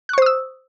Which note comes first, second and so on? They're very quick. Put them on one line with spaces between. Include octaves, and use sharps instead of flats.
F#6 C#6 C5 D#6 E6